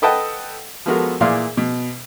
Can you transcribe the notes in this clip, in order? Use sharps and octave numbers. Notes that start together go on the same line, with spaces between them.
A4 B4 D#5 F#5 G5 A5
F3 G#3 B3 F#4 A4 A#4
A#2 E3 G#4 D5 F5 C6
B2